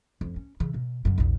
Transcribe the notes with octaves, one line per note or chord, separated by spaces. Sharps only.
F2
C#4
C#3 E3
B2
F#2 C#3
A#1 E2